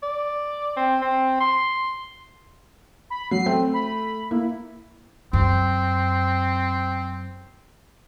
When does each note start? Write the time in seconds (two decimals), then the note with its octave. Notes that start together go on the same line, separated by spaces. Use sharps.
0.03 D5
0.77 C4
1.02 C4
1.40 C6
3.10 B5
3.31 F#3 C7
3.46 A3 C4
3.74 B5
4.31 A#3 E4
5.33 F#2 C4